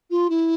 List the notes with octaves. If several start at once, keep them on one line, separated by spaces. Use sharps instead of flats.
F4
E4